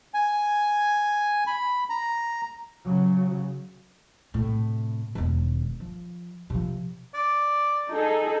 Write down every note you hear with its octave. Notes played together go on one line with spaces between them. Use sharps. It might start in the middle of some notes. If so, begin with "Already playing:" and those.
G#5
B5
A#5
C#3 F#3
A2 C3
E1 D#3
F3
C3 F3
D5
D#4 G#4 A4